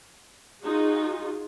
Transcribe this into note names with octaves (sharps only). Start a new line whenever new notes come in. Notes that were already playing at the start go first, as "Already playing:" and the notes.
D#4 F4 F#4 G#4